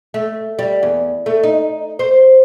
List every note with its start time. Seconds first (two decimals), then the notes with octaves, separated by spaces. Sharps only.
0.14 A3
0.59 G3
0.83 E2
1.26 A3
1.43 D#4
1.99 C5